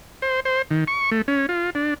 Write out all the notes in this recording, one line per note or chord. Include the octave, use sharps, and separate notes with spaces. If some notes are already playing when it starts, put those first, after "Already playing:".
C5
C5
D#3
C#6
A3
C#4
F4
D4